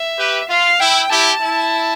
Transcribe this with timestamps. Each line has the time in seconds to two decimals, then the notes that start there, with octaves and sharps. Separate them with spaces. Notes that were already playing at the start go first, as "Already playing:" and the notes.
Already playing: E5
0.18 G4 B4
0.49 F4 F5
0.80 E4 G5
1.10 E4 G4 A5
1.41 E4